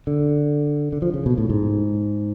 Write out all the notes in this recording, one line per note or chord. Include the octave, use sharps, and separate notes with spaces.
D3
D3
F3
C#3
B2
A2
G#2